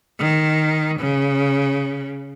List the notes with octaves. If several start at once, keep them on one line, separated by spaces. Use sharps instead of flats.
D#3
C#3